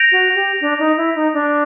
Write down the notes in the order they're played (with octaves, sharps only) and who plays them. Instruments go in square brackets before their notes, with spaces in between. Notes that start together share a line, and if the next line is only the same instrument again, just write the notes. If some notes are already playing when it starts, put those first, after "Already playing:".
Already playing: [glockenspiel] G6 A#6 D7 F7
[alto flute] F#4
G4
D4
D#4
E4
D#4
D4